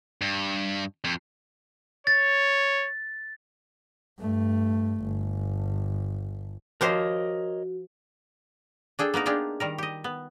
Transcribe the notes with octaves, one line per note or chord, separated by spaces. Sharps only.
G2
F2
C#5 A6
G2 A3
G1
F3 F#4 G4 A#4 C5 C#5 D#5
D4 G#4 A4 G5
A#3 B3 D#4 A#4
D4 D#4 F4 G4 G#4
D#3 G3 A#4
G4 D#5
B3